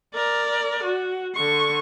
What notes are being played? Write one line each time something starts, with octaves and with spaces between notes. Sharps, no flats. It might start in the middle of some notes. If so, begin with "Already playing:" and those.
A#4 D5
F#4
D3 C#6